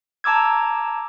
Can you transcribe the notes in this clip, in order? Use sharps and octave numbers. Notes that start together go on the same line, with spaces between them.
A5 A#5 D6 E6 G#6